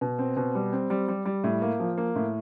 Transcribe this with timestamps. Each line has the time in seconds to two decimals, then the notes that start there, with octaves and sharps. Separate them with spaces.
0.01 B2
0.19 C4
0.37 B2
0.55 G3
0.72 C4
0.90 G3
1.08 G3
1.25 G3
1.44 A2
1.62 A#3
1.80 F3
1.98 A#3
2.16 A2